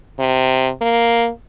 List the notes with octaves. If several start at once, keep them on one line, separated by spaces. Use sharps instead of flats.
C3
A#3